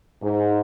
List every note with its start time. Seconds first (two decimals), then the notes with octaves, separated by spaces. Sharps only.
0.22 G#2